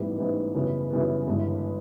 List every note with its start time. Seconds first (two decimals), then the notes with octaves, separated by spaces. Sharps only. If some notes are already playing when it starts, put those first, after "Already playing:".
Already playing: A1 G#2 E3 G3 B3
0.18 A1 G#2 E3 G3 B3
0.55 F#2 C#3 E3 G3 B3
0.90 F#2 C#3 E3 G3 B3
1.27 G1 G2 E3 G#3